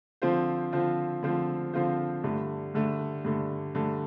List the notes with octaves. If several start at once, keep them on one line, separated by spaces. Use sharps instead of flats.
D3 F3 C4 F4 C5
D3 F3 C4 F4 C5
D3 F3 C4 F4 C5
D3 F3 C4 F4 C5
G2 D3 A3
G2 D3 A3
G2 D3 A3
G2 D3 A3